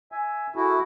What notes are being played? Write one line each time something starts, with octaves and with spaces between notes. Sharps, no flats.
E5 G#5
E4 F#4 G#4 A4